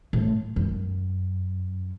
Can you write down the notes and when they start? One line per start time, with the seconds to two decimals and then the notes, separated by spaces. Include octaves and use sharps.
0.13 A2
0.56 F#2